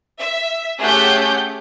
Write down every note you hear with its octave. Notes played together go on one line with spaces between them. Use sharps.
E5
A3 C#4 G4 G#4 F#5 G6